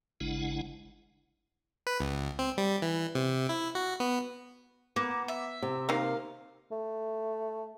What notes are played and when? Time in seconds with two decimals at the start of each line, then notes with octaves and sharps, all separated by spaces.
0.21 G#1 C#3 G#3 D4 E4 F#5
1.87 B4
2.00 C#2
2.39 C4
2.58 G3
2.82 E3
3.15 C3
3.49 E4
3.75 F#4
4.00 B3
4.96 A#3 B3
5.28 E5
5.62 C3
5.89 D#3 A#3 F5
6.72 A3